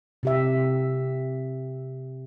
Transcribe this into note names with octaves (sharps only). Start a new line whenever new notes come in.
C3 G4 E5